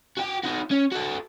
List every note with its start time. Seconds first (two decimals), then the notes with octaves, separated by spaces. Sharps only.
0.17 F#4 G5
0.43 D#4 F#4
0.71 C#4
0.92 F#4 A4